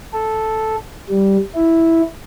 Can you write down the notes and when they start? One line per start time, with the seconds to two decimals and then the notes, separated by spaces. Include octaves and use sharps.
0.13 A4
1.09 G3
1.55 E4